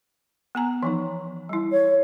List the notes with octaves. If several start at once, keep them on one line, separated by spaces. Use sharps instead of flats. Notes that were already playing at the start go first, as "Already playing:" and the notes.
B3 G#5 A#5
E3 F3 D#4
G3 E4
C#5